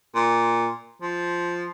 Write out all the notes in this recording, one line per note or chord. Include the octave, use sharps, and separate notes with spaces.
A#2
F3